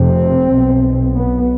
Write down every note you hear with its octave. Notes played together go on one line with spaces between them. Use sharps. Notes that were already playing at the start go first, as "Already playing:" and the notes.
Already playing: F1 F2 C3 C4
B1 B2
B3